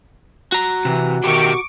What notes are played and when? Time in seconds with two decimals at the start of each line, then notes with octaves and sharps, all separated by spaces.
0.52 F#4 A#5
0.85 C3 E3
1.24 B2 D#3 G4 C#6 D6 D7